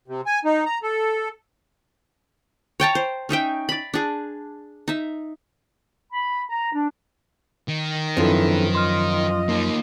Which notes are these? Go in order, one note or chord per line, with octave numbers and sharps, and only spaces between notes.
C3
G#5
D#4
A#5
A4
C#5 G5 A5 A#5
C5
C#4 D#4 E5 G5
D5 B5
D4 G#4
D#4 E5
B5
A#5
D4
D#3
F#2 F3 C4 D4 E4 A4 B4
F4 D#5 C6 F6
A#3 D#4